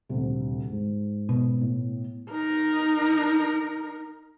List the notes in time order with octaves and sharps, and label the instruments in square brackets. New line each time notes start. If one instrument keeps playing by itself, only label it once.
[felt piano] D#1 D2 C3
G#2
[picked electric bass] B2
[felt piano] A2
[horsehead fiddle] D#4 A#4